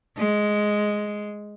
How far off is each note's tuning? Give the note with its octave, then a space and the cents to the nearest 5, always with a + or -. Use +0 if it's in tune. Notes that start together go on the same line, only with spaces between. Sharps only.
G#3 +5